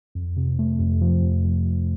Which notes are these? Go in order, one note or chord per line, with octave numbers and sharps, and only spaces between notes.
F2
C3
A3
F2
F3
F2
F3
F3